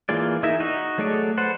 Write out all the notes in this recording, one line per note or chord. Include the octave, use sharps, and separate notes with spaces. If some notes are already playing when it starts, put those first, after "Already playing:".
E3 A#3 F4 G#4 D5
D#4 E4 G#4 A#4 E5
D#4 F#4 D#5
F#3 A3 G#4 A4 D5
A4 B4 C5 F#5